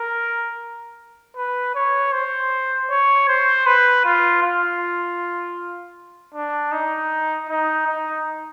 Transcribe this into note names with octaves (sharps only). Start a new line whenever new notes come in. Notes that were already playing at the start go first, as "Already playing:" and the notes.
Already playing: A#4
B4
C#5
C5
C#5
C5
B4
F4
F4
D4
D#4
D#4
D#4